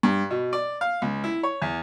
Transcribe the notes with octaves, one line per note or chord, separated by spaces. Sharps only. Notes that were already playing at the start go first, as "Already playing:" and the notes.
G2
B2
D5
F5
C#2
E4
C#5
E2